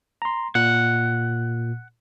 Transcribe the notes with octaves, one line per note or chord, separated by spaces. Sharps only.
A#5 C6
A#2 F#5